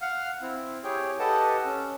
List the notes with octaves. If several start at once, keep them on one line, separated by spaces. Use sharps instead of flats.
F5 F#5 F6
C4 E4
E4 G4 G#4 C#5 G5
G4 A4 B4 D#5 F#5 A5
C#4